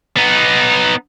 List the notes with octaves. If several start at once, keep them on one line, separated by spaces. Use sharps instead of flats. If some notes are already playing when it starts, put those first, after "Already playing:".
B3 D#4